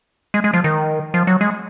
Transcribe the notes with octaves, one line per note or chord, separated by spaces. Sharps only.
G#3
G#3
F3
D#3
F3
F#3
G#3